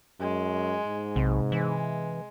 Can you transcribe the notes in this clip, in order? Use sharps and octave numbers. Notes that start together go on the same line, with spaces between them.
F#2 G#3
G#2
B1 C3
E3 G#3